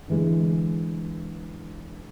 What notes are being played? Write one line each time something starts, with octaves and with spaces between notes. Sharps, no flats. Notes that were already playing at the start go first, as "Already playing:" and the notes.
D3 E3 G#3